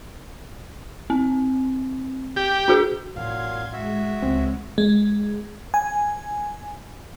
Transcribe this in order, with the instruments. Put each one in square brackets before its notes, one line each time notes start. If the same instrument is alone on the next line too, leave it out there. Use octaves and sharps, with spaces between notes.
[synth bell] C4
[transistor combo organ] G4
[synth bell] D4 F#4 G#4
[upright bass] A1 [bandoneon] A#2 F#3 F5 [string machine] C6 G#6
[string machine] G#3 [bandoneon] F#4 E5
[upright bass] C#2 [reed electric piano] C4
[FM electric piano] G#3
G#5